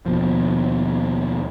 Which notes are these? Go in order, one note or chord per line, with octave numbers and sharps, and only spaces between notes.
D#2 B2 F3